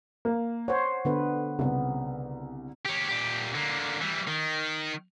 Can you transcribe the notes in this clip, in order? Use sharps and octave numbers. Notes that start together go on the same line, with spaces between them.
A#3
C5 C#5 F#5
D3 B3 B4
C2 C#3 B3
G4 C#5
A#2 G4
D3 A#3
E3 G3
D#3